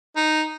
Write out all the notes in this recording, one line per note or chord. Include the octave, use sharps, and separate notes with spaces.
D#4